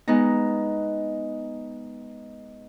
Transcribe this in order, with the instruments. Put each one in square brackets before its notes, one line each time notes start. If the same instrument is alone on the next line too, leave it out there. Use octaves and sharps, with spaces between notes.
[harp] G#3 B3 D#4